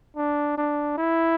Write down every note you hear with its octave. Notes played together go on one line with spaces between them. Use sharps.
D4
D4
E4